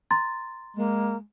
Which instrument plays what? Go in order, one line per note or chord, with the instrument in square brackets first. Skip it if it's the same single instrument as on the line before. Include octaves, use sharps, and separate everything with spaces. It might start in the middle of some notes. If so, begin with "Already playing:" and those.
[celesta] A#5 C6 A6
[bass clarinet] G#3 [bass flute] A#3